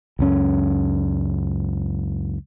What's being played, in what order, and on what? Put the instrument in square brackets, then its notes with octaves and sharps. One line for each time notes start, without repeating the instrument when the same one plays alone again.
[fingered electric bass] C#2 F#2 C#4